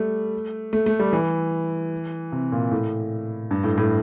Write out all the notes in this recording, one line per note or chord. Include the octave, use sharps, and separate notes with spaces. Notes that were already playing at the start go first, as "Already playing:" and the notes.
Already playing: G3 A3
A3
A3
G3
E3
C3
A#2
A2
G2
A2
A2